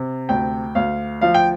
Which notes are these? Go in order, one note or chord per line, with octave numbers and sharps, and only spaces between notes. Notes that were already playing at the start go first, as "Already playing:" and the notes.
Already playing: C3
D2 G5
D2 F5
F3 F5
G5